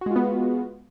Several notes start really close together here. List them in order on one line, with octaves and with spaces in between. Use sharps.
F#4 G#3 F4 B3